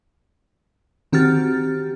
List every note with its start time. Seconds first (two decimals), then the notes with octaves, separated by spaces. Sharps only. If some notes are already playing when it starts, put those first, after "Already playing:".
1.12 D#3 C4 F#4 G4 F6 A6